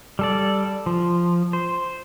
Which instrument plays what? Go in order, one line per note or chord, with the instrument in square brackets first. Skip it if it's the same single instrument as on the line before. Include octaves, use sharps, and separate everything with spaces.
[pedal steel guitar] G3 A4 D5
F3
C5